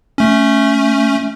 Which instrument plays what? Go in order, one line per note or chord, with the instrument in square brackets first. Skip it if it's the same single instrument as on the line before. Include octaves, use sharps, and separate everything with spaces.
[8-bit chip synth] A3 C#4